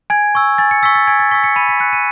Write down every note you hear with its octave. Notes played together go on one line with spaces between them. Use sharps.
G#5 G#6
C#6 E6
G#5 A6
C#7
C#6 E6 B6
A6
G#5 G#6
A6
C#6 E6 B6
C#7
B5 D#7
B6
F#6 C#7
D#7